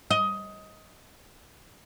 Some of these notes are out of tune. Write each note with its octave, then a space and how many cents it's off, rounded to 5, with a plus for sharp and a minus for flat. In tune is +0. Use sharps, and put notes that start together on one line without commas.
D#5 +15